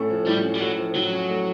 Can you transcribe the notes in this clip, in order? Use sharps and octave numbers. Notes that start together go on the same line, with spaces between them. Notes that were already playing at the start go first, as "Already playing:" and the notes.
Already playing: A2 A3 C#4
F3
A2 G3
C#4
G3
F#3 A3
F3
A2 F#3
C#4
A3